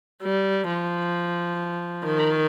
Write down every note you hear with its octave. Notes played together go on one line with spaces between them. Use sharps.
G3
F3
D#3